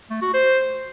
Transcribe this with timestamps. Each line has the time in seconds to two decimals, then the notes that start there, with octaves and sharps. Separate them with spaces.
0.10 A3
0.22 F#4
0.34 C5